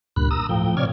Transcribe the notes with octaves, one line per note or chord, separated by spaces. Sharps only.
D2 G2 A#2 B5 F#6
A#5 D#6 E6
A2 F3 G5
C3 C#5 D5 F6 G#6